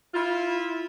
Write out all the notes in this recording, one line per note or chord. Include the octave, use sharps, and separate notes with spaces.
E4 F4